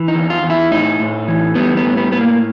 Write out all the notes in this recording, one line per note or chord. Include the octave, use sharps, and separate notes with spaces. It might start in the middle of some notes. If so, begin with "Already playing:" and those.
Already playing: E3
D#4
E2
F4
E2
E4
A2 D#4
A2
E3
G3 B3
B3
A2
B3
A2 B3
A#3